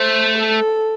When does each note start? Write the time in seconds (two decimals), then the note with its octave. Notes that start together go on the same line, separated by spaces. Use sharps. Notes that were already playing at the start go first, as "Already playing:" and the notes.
Already playing: A3 C5
0.39 A4